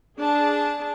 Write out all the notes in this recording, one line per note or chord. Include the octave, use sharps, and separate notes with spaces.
D4 G#4 A5